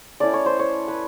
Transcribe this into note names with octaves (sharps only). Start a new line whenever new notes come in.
A3 C#4 E4 D5
C#5
C5
C#5
B4